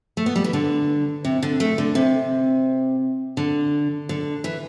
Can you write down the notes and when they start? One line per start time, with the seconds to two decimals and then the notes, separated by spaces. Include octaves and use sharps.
0.17 A3
0.26 B3
0.36 G3
0.44 E3
0.53 D3
1.25 C3
1.42 D3
1.60 A3
1.78 D3
1.95 C3
3.37 D3
4.09 D3
4.44 E3